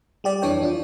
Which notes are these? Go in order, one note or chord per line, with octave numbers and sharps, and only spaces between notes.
G3 G4 D5
F2 E3 D4 C#5 G5
E3 D4 F4